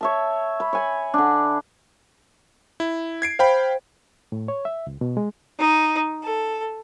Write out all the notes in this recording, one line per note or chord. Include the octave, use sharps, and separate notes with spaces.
C#5 E5 A5
B5
C#5 G#5 B5
D3 D4
E4
G#6 C7 D7
C5 F5 G5 B5
A2
C#5
E5
C#2
B2
G#3
D#4
A4